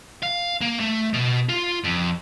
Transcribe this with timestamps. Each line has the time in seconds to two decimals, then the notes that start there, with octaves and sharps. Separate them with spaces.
0.23 F5
0.61 A#3
0.80 A3
1.14 B2
1.49 F4
1.84 F2